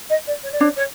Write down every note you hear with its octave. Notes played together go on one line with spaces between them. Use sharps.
D#5
D5
C#5
D5
D4 C#5
C#5